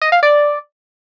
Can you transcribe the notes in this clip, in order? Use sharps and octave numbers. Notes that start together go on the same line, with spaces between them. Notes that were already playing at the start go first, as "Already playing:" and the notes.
D#5
F5
D5